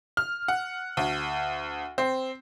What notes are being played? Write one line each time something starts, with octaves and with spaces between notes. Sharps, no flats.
F6
F#5
D2
C4